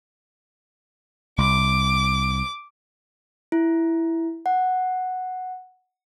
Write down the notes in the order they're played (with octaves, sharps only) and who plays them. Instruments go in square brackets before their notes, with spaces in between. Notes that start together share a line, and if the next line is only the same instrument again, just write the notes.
[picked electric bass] C2 [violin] D6
[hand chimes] E4
F#5